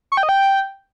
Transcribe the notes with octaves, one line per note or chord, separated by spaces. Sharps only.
C#6
G5
D#5
G5